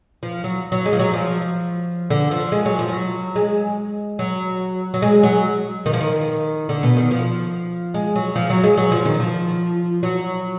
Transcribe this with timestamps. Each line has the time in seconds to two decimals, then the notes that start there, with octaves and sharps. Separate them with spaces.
0.23 F3
0.44 F#3
0.72 F#3
0.86 G#3
0.92 F3
0.99 F#3
1.13 F3
2.10 D3
2.31 F3
2.52 G#3
2.66 F#3
2.79 F3
2.92 F#3
3.36 G#3
4.19 F#3
4.94 F#3
5.02 G#3
5.23 F#3
5.86 D#3
5.93 F3
6.01 D#3
6.69 D3
6.83 B2
6.96 D#3
7.11 F3
7.94 G#3
8.16 F#3
8.36 F3
8.50 F#3
8.64 G#3
8.77 F#3
8.92 F3
9.05 D#3
9.19 F3
10.03 F#3